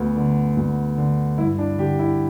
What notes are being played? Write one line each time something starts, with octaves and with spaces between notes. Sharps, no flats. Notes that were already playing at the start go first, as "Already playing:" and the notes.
Already playing: D2 B3
D3
D2
D3
G2 E4
D4
D3 G4
E4